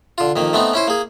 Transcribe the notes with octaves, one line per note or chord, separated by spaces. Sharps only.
D3 F4
F2 D#3 A#3
A3 B3 C4 D#4
C#4 E4 C5
A#3 G#4